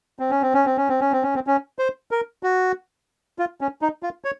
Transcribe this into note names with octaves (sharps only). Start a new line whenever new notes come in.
C4
C#4
C4
C#4
C4
C#4
C4
C#4
C4
C#4
C4
C#4
C5
A#4
F#4
F4
C#4
D#4
F4
C#5